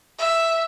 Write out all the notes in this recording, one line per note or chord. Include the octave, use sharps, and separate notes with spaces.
E5